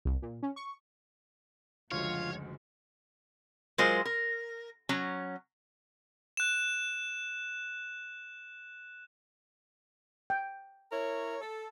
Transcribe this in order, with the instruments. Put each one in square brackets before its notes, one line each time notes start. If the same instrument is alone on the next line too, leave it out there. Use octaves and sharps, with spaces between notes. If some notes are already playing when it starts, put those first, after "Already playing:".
[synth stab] C2
A#2
C#4
C#6
[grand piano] F#1 D2 G#3 [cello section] F3 F#4 [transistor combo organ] F4 [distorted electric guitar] C#5
[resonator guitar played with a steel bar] F#3 G#3 F4 A#4 C5
A#4
F#3 C#4 A#5
[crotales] F#6 E7
[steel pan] G5
[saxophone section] E4 A#4 C#5
A4